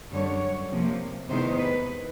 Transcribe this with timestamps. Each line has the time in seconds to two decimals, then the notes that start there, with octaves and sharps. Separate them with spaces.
0.10 F#2 D3 G3 C#5
0.69 C3 F3 A#3
1.28 E2 C3 D#3 G#3 B3 C5
1.57 B4